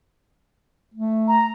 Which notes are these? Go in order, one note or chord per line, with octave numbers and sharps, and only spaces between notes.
A3
A#5